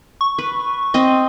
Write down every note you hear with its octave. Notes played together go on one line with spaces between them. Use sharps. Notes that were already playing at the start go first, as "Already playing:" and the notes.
C#6
B4
C4 D#5